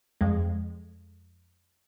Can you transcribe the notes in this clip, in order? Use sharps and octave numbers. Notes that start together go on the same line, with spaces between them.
F2 G#3